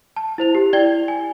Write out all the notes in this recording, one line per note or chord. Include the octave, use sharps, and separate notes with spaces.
A5
E4 C5 F7
G4
E4 D5 G5 G#6 G7
G#5